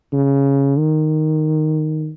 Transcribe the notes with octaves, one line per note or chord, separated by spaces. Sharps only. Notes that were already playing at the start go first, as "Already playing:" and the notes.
C#3
D#3